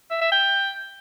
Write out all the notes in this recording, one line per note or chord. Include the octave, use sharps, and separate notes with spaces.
E5
E5
G5